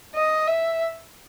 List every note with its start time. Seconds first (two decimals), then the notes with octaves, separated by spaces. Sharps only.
0.15 D#5
0.47 E5